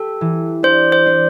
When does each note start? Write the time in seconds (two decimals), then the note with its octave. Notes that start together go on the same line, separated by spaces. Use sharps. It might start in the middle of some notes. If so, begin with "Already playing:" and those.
Already playing: G4 A4
0.21 E3
0.63 D4 C5
0.92 C5
1.06 D4